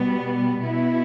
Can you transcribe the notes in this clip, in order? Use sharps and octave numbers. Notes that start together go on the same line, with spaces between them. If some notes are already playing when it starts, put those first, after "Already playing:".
Already playing: B2 G3 B3
B2 B3 E4